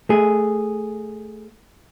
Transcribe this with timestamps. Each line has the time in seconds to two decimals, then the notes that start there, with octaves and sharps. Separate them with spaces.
0.09 A3 G#4